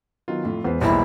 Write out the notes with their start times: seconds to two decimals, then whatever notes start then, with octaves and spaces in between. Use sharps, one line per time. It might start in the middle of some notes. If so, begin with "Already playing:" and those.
0.28 D#3 F#3 B3 F4
0.44 F2 A2
0.64 E2 G#3 B4 C5
0.81 B1 E2 G3 A#3 E4